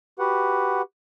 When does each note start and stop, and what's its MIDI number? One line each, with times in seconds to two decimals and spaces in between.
0.19 0.82 66
0.19 0.82 67
0.19 0.82 71
0.19 0.82 78